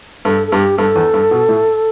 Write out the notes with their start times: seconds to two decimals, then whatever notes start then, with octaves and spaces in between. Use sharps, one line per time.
0.25 G2 A4
0.47 A4
0.52 G2 G4
0.78 G2 A4
0.95 E2
1.14 G2
1.31 B2
1.49 A2